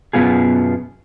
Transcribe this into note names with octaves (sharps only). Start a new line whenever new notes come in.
F#2 B2 F3 B3 F4 G#4